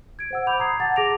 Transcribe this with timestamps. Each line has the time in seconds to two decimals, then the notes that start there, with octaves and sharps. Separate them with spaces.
0.19 G#6 D7
0.31 C5 F#5 E6
0.47 B5 D6 G6 F7
0.59 A#5 D#6 G#6 C7
0.80 F#5 A5 A#5 A6
0.96 G#4 D6 A#6 D7 F7